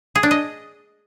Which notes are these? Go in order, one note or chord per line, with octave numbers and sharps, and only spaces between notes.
G#4
D4
D#5